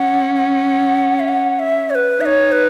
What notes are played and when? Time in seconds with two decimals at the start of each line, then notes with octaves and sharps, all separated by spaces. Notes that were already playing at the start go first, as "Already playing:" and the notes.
Already playing: C#4 F#5
0.35 F#5
1.20 E5
1.28 F#5
1.59 E5
1.90 C#5
1.95 B4
2.20 D#4 E5
2.26 C#5
2.52 B4